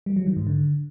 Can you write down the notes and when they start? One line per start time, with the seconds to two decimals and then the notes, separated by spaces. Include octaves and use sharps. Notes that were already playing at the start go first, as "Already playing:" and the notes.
0.06 G3
0.16 F#3
0.26 D#3
0.37 G#2
0.47 D3